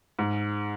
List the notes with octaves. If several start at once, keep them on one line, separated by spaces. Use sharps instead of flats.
G#2